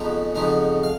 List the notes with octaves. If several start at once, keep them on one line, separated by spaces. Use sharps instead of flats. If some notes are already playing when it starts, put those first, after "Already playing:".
Already playing: F2 C#3 F3 B3 D#4
F2 C#3 F3 B3 D#4
F5